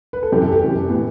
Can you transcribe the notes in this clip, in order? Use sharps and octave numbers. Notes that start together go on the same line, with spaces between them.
B4
A4
F#2 E3 G4
A4
G4
F#2 E3
A2 E3 B3